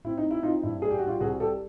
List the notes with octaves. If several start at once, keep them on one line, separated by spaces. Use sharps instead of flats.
C4 E4
D#4
C4
E4
C4 D#4 F4
G2 E4
G3 G#4
G4
G3 F#4
F4 G4
C2 F#4 G#4
G3 G4 A4